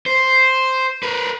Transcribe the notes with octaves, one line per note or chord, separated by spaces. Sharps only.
C5
A#4 B4